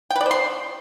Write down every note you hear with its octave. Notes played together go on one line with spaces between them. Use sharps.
G5
B4
D5
C5
C6